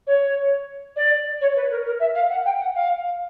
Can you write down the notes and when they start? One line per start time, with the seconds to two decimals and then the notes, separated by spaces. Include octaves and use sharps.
0.07 C#5
0.96 D5
1.41 C#5
1.56 B4
1.70 A#4
1.86 A#4
2.00 E5
2.15 F5
2.30 F#5
2.45 G5
2.60 F#5
2.74 F5